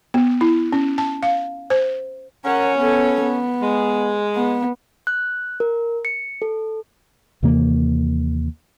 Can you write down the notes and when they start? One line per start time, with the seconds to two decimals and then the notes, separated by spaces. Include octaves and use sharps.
0.14 B3
0.41 E4
0.73 C#4
0.98 A5
1.23 F5
1.70 C5
2.45 C#4 A#4 F#5
2.77 B3 A4
3.22 B3
3.61 G#3
4.36 B3
5.07 F#6
5.60 A#4
6.05 C#7
6.42 A4
7.43 D#2 C3 E3 A#3